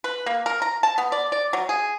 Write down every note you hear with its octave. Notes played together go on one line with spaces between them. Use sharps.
B4
A#3
A#4
A#5
A5
B3
D5
D5
F#3
G#4